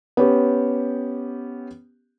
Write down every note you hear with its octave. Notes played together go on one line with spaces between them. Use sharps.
B3 C#4 G4